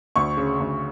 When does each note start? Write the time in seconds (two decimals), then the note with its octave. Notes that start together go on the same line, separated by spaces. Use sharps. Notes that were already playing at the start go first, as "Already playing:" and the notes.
0.16 D2 C#6
0.37 C#3
0.60 D2